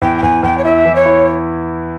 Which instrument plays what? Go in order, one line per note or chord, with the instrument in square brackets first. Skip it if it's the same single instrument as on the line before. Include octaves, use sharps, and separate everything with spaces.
[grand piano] E2 [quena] G5
[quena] G5
[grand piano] E2 [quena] G#5
[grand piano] E2 [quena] G5
[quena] C#5
[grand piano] E4 [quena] E5
[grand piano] E3
[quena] C#5
[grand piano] E4